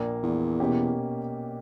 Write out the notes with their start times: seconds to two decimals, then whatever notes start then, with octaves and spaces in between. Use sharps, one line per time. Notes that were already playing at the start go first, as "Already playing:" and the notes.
Already playing: A#1 A#2 A#3
0.23 E2
0.60 B2 A#3 C#4 G4